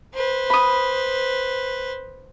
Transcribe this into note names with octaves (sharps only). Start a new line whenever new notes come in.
B4 C5
B5 D#6